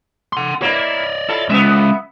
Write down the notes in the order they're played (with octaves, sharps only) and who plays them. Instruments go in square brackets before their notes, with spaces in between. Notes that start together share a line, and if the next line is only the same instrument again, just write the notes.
[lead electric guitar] F#5 C6
[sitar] A#3 E4 [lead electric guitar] C#5 D5
[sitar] E4 F4 A4
[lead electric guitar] G#3 C#4 [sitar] B3 E5